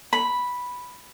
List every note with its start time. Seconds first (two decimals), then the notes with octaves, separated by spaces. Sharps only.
0.13 B5